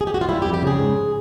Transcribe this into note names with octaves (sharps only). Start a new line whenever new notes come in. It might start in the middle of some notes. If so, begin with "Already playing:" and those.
G#4
G4
F#4
F4
G3 E4
G4
F2
G4
C#3 G#4
G#2